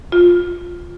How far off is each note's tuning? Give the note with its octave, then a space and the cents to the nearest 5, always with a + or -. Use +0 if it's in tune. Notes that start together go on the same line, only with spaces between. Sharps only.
F4 +10